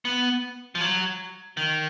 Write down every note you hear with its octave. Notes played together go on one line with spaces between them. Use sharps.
B3
F3
F#3
D#3